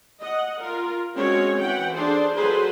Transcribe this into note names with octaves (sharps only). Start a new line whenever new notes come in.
D#5 F#5
F4 A#4
G#3 C4 C#4 F#4 A#4 C#5
E3 F#5 G5
D4 G#4 A4 C5
F#3 F4 G#4 A4 B4 C5